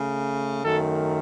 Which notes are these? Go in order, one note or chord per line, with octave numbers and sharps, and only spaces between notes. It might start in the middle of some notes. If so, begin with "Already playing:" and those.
Already playing: C#3 A3
F#2 D#3 A3 A4